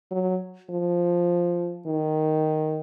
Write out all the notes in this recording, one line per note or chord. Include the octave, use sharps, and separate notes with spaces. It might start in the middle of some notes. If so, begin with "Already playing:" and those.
F#3
F3
D#3